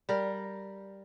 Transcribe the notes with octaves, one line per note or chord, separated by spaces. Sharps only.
G3 A#4